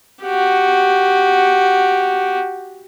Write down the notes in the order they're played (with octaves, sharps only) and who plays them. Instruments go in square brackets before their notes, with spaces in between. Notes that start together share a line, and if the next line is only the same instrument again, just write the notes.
[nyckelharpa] F#4 G4